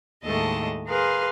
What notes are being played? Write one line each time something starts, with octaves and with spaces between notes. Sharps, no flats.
D#2 A2 G#3 A3 D#5 A5
G#4 A#4 B4 F5 C6